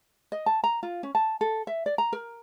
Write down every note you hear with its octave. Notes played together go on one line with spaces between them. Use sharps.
D#5
A5
A#5
F4
C#4
A5
A4
E5
D5
A#5
A#4